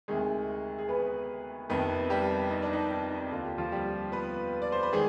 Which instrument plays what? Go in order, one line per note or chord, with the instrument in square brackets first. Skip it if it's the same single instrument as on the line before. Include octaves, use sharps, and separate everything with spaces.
[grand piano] D2 C3 D#3 G#3 G#4
G#4
B3 B4
F2 C3 D#3 B3 B4
G3 G4
D#4
D4
D#4
D#4
D#2 D3 F4
G4
F3 F4
G3 G4
B3 B4
D5
C5
B4
D#3 G#3 G#4